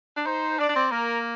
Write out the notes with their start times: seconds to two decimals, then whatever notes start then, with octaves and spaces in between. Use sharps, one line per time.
0.17 D4
0.26 D#4 C5
0.58 D4 D5
0.69 D4
0.76 C4
0.91 A#3 A#4